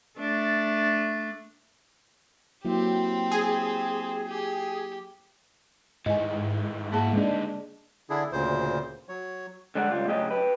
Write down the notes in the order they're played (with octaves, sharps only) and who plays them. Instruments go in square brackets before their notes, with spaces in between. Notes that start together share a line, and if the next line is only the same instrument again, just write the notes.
[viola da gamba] A3 D4
[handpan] F#3 A#3 E4 [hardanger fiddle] C4 G4
[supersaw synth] G#4
[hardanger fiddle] G4
[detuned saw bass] G#2 [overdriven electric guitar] D#3 E3 [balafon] D#5 G#5
[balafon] A#3 G#4 A5 [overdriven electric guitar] E4 F#4
[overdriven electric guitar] G2 D#4 [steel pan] G#3 D4
[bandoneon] D3 D4 E4 G#4
D2 A#2 C#3 C5
F#3 C#5
[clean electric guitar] D3 G3 G#3 D5 F#5
C#2 G3 F4
A2 C#3 F#3 C#4 G4 D#5
G4 B4